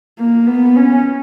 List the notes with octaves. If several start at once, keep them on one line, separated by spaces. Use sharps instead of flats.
A#3
B3
C#4